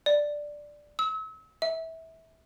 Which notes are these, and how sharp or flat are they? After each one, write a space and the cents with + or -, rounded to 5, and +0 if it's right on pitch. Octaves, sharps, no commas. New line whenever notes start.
D5 +5
E6 -40
E5 -20